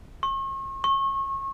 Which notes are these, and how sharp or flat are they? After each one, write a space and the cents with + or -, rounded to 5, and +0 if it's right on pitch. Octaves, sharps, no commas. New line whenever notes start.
C#6 -40
C#6 -30